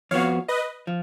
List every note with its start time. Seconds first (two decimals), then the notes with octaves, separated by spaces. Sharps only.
0.11 F2 F3 B3 F#4 C#5 F5
0.48 B4 D#5
0.87 F3